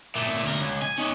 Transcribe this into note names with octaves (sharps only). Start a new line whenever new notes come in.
A#2 A3
D2 A#4
C#2
G#5
C#4 D#4